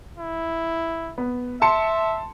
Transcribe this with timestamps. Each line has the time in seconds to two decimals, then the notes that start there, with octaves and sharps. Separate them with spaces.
0.18 E4
1.18 B3
1.62 E5 A5 C6 C#7